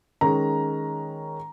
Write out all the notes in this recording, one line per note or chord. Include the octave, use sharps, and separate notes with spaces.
D#3 G#3 C#4 A#5